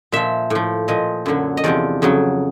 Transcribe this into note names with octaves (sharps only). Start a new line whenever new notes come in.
A#2 F3 E5
A2 F3
A#2 F3 D#5
F#2 D3 F#3
D#5
E2 C3 F3 D5
F2 C#3 F#3